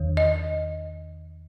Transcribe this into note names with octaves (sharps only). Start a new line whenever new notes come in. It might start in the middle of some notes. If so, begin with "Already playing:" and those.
Already playing: E2 D#3
D#5